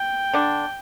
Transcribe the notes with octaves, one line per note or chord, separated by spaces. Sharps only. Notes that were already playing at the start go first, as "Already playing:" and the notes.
Already playing: G5
D3 D4